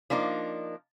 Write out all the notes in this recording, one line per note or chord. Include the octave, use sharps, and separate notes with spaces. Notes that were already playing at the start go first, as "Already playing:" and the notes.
F3 A#3 D4 D#4